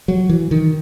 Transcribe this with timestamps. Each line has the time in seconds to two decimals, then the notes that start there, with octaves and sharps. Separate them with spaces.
0.08 F#3
0.29 E3
0.51 D#3